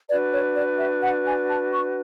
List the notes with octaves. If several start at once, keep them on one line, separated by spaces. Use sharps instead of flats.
D4 F#4 B4 D5
C#5
D5
E5
F#5
G#5
A5
C#6